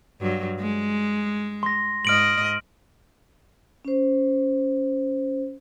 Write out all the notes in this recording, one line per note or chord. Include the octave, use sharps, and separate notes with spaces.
G2 F#3
G#3
C6 A#6
G#2 D#5 F6 D7 F#7
C#4 C5